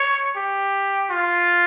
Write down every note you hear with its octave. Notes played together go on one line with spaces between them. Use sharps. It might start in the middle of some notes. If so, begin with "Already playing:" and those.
Already playing: C#5
G4
F4